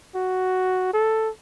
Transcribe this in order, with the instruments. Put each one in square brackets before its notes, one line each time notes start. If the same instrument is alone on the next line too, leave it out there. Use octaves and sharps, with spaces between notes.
[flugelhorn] F#4
A4